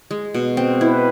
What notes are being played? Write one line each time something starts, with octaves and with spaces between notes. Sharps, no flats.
G#3
B2
C4
E4 B4